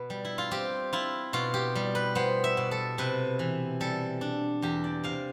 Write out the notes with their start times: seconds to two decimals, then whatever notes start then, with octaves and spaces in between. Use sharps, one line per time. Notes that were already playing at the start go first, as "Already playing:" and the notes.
Already playing: B2 B4
0.10 G3
0.25 E4
0.38 F4
0.51 C4 G4
0.93 E4 F4
1.33 B2 F4
1.54 G4
1.76 G3
1.95 B4
2.15 B3 C5
2.44 E5
2.57 B2
2.71 A4
2.98 C3 B4
3.39 E3
3.81 G3 A4
4.21 D4
4.62 E2 G4
4.84 D5
5.04 C3 F5